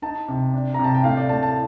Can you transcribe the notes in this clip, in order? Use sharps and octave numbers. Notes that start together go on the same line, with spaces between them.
D#4 A5
C3
D4
C3 A#5
A5
G5
A2 F5
D5
A2 A5
A5